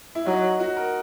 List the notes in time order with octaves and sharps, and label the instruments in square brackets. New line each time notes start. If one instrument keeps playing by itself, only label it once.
[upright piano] E4
[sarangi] F#3 [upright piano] D#4
[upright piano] F#4
A#4